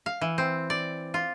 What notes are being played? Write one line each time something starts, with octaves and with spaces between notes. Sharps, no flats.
F5
E3
C4
D5
F4